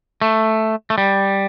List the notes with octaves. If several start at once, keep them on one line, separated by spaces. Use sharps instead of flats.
A3
A3
G3